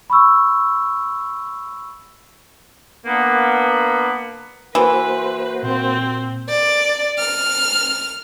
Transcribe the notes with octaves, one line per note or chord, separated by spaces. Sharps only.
B5 C#6 E6
A#3 B3 D4
E3 A#3 F#4 B4 C5
A#2 C4
D5
F6